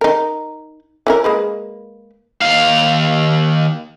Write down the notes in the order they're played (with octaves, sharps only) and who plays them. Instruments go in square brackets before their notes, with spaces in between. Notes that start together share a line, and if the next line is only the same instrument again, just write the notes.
[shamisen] D#4 A#4
E3 C#4 A#4
G#3 A#3 B4
[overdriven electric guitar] D#2 F5